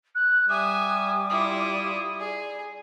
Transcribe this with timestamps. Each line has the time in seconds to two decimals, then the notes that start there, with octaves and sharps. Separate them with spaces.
0.15 F#6
0.49 G3 E5 G#5 D6 D#6
1.30 E4 F4 D#6
2.20 G#4 D5